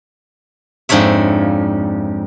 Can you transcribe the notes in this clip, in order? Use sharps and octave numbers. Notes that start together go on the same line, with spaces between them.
F2 G#2 D4 C#5 E5